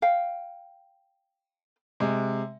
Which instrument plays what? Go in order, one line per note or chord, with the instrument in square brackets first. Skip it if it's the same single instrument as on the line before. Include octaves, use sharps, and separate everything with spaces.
[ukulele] F5 G5
[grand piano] C3 G#3